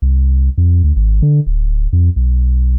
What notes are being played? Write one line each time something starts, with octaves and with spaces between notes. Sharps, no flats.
C2
F2
D2
G#1
D3
D1
F2
B1